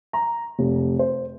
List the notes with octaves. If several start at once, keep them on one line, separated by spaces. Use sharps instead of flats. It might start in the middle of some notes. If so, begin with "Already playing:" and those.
A#5
F1
C5